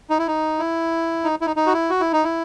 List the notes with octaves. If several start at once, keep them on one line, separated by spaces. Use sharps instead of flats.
D#4
E4
D#4
E4
D#4
E4
D#4
D#4
F#4
E4
F#4
E4
D#4
E4